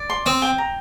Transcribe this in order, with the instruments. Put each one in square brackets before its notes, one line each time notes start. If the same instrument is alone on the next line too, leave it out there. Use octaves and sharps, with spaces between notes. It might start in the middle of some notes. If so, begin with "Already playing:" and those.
Already playing: [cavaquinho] D5
C6
[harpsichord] C4 [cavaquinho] D#6
[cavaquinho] G5
A#5